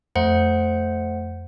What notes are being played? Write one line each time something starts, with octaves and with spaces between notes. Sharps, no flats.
F2 A3 C5 F#5